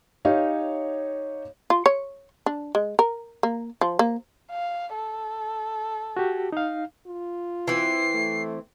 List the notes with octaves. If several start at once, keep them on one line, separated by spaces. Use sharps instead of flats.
D#4 G4 C#5 F5
F4
C#5
D4
G#3
A#4
A#3
F3
A#3
F5
A4
F#4 G4
D#4 F5
F4
E3 C4 C7
A3